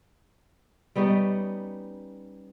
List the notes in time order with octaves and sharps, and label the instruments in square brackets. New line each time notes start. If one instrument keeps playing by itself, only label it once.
[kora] G3 B3 C#4 D#4